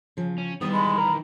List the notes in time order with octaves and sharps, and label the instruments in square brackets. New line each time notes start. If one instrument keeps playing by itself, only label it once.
[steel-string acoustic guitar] C#3 F3
[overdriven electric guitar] C#4
[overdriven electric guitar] D#3 E3 [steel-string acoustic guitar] G3 B3 [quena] D#6
[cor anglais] G#3 [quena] B5
[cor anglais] A#4